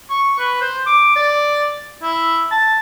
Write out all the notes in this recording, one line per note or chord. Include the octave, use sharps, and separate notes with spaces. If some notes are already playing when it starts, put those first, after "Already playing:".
C#6
B4
C5
D6
D5
E4
A5